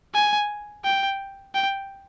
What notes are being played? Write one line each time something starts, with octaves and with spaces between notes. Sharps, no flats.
G#5
G5
G5